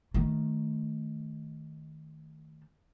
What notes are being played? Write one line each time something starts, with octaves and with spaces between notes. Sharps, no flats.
D#3 A3